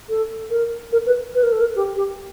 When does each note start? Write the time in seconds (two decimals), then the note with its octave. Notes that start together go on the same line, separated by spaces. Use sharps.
0.09 A4
0.50 A#4
0.92 A#4
1.07 B4
1.35 B4
1.43 A#4
1.52 A4
1.61 A#4
1.76 G4
1.96 G4